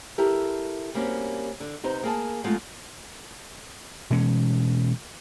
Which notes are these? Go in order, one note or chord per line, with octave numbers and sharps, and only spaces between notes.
E4 G4 A4 A#4
G3 A#3 C4 C#4 F#4
D3
C3 B3 D#4 C5
A#3 G#4 A5
F2 G#3 A3 F4 F5 F#5
B2 E3 G#3 C#4